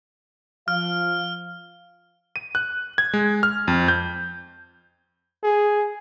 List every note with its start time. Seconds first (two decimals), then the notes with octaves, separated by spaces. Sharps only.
0.68 F3 F5 F6
2.36 D#7
2.55 F#6
2.98 G#6
3.13 G#3
3.43 F6
3.68 F2
3.88 G6
5.44 G#4